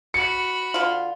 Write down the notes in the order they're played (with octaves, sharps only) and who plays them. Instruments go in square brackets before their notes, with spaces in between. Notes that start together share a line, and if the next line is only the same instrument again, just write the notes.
[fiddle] F#4 B5 [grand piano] C#7
[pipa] D3 F4